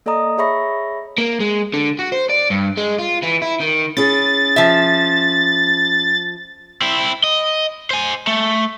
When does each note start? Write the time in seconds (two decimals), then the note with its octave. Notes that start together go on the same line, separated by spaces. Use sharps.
0.06 A#3 A4 D5 D#5 A#5 D#6
0.38 G#4 C#5 E5 B5 C#6 A#6
1.18 A#3
1.40 G#3
1.74 D3
1.99 F#4
2.12 C5
2.30 D5
2.50 G2
2.77 G#3
2.98 F4
3.23 E3
3.42 E4
3.61 D#3
3.97 C#4 E4 G#4 A6
4.56 F3 E5
6.82 C4 E4
7.24 D#5
7.91 C5 G#5
8.27 A3